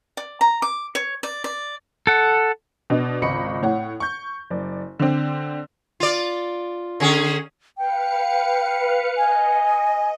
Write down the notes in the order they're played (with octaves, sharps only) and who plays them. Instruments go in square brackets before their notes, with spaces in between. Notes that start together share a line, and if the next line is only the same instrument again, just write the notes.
[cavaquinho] D5
A#5
D6
C#5
D5
D5
[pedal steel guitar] A4 F#5
[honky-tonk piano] B2 D4 D#5
G#1 C#2 D#5 B5 C#6 C#7
A2 C#5 F#5
C#6 G6
F#1 D5
D3 C4
[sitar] F4 D5
D3 C#4 G#4
[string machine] B4 F5 C#7 [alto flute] G5
[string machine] D#5 [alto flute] G#5